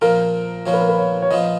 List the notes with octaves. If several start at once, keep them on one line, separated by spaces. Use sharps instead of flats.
A#2 F3 A#3 F4 A#4
A#2 F3 A#3 F4 C#5
B4
A#4
B4
C#5
C#5
A#2 F3 B3 F4 D#5